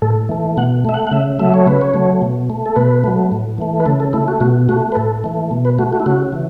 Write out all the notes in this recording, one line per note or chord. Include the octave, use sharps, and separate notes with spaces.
A2 A4
E3 A3
B2 F#5
A3 E5
F#5
F#5
C#3 E5
F#3 A3 E5
C#5
C#3 B4
C#5
F#3 A3
B2
A3
A4
B2 B4
F#3 A3
A2
E3 A3
B4
C#3 A4
A4
A3 E4
F#4
B2 F#4
A3 F#4
B4
A2 A4
E3 A3
B2
B4
A3 F#4
F#4
E4
C#3 F#4
E3